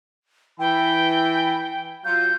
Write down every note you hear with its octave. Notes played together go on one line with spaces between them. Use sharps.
E3 G5 G#5 B5
F#3 F4 G6